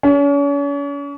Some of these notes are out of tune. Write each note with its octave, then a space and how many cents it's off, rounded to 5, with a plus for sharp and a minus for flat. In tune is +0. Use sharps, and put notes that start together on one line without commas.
C#4 +40